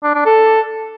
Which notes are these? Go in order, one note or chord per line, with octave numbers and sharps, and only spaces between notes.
D4
D4
A4